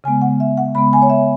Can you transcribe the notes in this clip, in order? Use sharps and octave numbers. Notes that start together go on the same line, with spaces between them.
C#3 G#3 B3 G#5
F#5
E5
F#5
C#3 G#3 B3 B5
G#5
C#5
E5